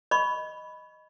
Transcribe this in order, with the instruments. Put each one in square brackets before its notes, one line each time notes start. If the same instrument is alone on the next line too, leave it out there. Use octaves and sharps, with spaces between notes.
[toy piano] D#5 B5 C#6